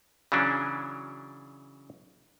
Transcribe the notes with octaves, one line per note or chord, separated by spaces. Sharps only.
C#3 E3 F#3 C#4 D4